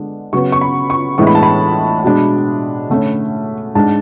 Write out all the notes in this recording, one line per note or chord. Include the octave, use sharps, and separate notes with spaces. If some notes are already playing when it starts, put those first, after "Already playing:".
Already playing: D3 G#3 B3 D4
C#3 F#3 B3 C#6
C#6
B5
C#6
A2 E3 G#3 B3 D4 C#6
B5
A5
B5
B2 G#3 D4
D3 A3 C#4
G#2 G#3 D4 A5